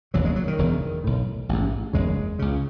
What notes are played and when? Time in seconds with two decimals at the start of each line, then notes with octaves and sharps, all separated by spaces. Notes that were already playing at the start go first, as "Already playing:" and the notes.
0.14 E1 D#2 C#3 F#3
0.25 G#3
0.36 F#3
0.48 D#3
0.58 E1 E2 C#3
1.04 B1 A2
1.49 A1 G#2
1.93 F#1 E2 C#3 G#3
2.39 C#2 C#3